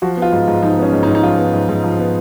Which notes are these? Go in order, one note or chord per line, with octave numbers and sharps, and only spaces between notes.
F3 F#4
B3
F4
G#2
G#2
F3 D#4
B3
C#4
G#2
D#4
G#2
D#4
F3 F4
B3
G#2
G#2
F3
B3